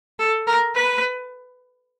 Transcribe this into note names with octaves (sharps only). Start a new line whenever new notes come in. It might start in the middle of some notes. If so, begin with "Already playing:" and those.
A4
A#4
B4